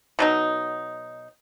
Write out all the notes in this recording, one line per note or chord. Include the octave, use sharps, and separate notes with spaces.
B2 F#3 D#4